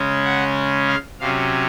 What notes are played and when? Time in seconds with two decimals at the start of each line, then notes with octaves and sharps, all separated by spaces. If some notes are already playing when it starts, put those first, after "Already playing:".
Already playing: C#3 G#3 C#4
0.25 F#5
0.88 F5
1.20 C3 F#3 C#4 F5